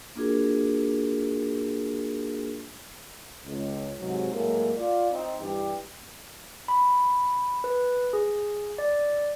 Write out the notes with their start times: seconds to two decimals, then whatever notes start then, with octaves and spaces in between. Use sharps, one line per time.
0.15 A#3 D4 F4 F#4 G#4 A#4
3.45 C#2
3.99 G#2 C3 F#3
4.32 A2 F#3 G#3 A#3
4.77 F4 D5
5.11 C4 D#4
5.41 G2 E3 G4
6.68 B5
7.64 B4
8.13 G#4
8.78 D5